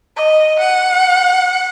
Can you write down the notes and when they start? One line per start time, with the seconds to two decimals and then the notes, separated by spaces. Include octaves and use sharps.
0.16 D#5
0.59 F#5